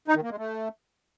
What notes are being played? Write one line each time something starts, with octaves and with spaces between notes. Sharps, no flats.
D#4
D#3
A#3
G#3
A3